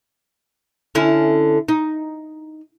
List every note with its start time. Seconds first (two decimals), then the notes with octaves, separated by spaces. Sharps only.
0.95 D3 C#4 E4
1.69 D#4